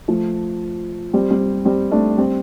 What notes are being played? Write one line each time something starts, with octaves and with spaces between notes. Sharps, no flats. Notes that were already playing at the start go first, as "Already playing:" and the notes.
F3 A3
G3 C4
G3 C4
G3 C4
A3 D4
G3 C4